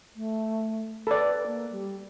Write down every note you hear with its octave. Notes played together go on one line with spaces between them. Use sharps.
A3
A4 B4 D5
A#3
G3